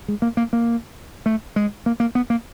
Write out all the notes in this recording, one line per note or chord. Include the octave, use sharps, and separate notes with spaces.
G#3
A#3
A#3
A#3
A3
G#3
A#3
A#3
B3
A#3